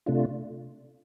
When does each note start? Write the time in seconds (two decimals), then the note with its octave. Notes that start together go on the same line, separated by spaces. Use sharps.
0.06 C3 A3 D4 F4